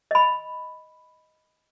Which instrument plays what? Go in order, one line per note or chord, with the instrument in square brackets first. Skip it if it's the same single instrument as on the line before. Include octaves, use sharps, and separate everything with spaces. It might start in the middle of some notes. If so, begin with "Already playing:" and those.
[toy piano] D#5 B5